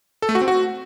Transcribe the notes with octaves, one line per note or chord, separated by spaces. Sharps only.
A4
A3
F#4
C4
F#4